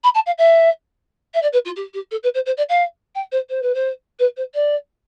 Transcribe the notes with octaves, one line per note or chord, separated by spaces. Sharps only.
B5
A5
F5
E5
E5
D5
B4
F4
G4
G4
A4
B4
C5
C5
D5
F5
G5
C5
C5
B4
C5
B4
C5
D5